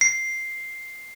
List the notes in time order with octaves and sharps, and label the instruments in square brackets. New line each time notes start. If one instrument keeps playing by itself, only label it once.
[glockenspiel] C7